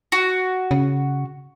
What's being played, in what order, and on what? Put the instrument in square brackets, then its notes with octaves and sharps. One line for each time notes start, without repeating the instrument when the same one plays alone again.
[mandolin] F#4
[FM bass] C#3